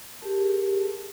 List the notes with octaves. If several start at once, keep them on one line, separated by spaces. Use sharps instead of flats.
G4 G#4 A#4 A5